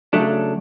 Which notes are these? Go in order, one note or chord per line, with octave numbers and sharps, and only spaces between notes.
C#3 F#3 A3 D4